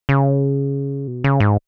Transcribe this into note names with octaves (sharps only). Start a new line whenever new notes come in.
C#3
B2
C#3
G#2